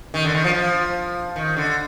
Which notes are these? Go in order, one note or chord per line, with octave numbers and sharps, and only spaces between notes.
D#3
D3
D#3
F3
F3
D#3
D3